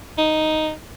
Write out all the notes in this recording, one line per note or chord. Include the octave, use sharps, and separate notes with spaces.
D#4